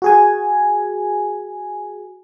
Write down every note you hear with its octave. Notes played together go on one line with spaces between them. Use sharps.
F#4 G#4 G#5